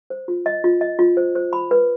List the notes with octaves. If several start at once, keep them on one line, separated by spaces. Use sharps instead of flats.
C5
F4
D#5
F4
D#5
F4
C5
C5
B5
B4